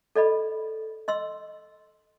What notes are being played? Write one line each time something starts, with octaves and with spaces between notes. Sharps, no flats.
A4 D5 D#5 B5
D#5 C6 E6